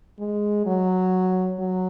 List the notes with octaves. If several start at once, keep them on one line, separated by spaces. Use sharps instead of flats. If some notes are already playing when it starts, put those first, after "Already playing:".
G#3
F#3
F#3